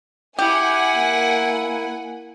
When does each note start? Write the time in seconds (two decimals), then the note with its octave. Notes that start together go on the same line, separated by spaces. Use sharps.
0.39 E4 G4 F#5 G#5
0.95 A#3